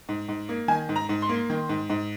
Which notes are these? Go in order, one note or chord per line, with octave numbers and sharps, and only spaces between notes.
G#2
G#2
A#3
D#3 G#5
G#2
A#5
G#2
C6
A#3
D#3
G#2
G#2